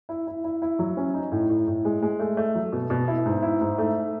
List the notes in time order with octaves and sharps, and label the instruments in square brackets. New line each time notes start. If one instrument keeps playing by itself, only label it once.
[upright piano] E4
E4
E4
E4
F#3
C#4
D#4
A2
A2
A2
G#3
G#3
A3
A3
F#3
B2
B2
E4
G#2
E4
G#2
A3